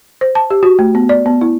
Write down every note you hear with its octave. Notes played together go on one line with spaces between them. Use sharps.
C5
A5
G4
F#4
A3
B3
D5
B3
E4